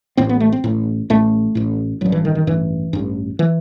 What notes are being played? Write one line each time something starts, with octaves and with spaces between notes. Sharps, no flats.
A1 A2 C4
B3
A3
C4
A1 A2
A1 A2 A3
A1 A2
A1 G2 F#3
E3
D#3
D#3
A1 G2 E3
A1 G2
E3